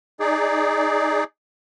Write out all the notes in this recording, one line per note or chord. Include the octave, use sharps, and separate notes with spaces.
D#4 G#4 D5